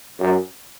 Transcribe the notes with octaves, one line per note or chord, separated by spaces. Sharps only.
F#2